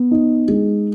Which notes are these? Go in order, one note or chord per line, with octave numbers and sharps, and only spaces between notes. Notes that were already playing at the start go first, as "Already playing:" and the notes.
Already playing: B3
D#4
G#3